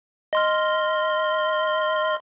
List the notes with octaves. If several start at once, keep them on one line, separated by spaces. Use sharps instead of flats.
D#5 C6 F6